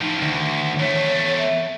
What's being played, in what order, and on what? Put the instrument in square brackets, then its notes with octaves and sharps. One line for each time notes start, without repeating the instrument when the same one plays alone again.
[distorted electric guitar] A2 F3 [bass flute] D#4
[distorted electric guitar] D2 [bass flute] D#3
[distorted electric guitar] E2 A3 [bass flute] C#5
[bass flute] E5